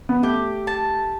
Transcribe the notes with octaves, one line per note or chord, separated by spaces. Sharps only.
B3
A3 G4
A5